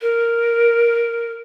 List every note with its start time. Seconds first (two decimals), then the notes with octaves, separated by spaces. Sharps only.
0.01 A#4